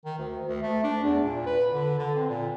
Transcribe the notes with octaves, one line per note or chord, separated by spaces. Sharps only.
D#3
D2
D2
A3
D4
E2
A#2
B4
D3
D3
C4
A#2